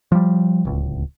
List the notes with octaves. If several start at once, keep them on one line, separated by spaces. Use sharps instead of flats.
F3 G3
D1 C#2